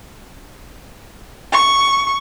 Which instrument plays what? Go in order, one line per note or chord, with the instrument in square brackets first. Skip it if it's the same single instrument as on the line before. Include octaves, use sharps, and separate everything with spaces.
[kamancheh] C#6